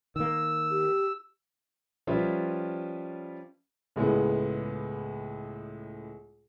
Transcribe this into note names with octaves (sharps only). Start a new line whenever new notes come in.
D#3 A#3 E6
G4
F3 G3 C#4 F4 B4 E5
C#2 A2 G#3 B3